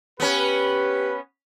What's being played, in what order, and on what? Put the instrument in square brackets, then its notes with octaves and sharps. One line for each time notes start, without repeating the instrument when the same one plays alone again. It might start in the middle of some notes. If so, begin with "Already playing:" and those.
[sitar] B3 C#4 [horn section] G4 B4